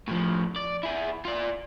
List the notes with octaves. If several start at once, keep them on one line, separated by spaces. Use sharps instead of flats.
A2 F3
D5
E4 G#4
F4 D5